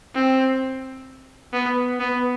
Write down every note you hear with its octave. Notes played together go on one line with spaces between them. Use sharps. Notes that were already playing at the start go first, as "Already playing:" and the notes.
C4
B3
B3